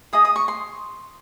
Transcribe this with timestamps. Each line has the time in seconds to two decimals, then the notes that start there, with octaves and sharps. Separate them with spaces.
0.13 G#4 D#5 D#6
0.25 D#6
0.36 C#6
0.48 C6